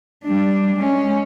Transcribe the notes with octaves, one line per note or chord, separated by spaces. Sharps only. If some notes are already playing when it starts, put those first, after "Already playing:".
G3 D4
G#3 C#4